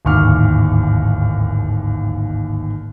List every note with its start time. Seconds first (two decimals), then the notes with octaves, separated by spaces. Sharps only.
0.05 D1 G#1 D#2 C#6 D6 F6